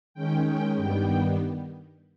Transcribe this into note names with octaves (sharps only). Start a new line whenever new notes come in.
D#3 G#3 C#4 G5
G5
G2 D#3 G3 B3 G5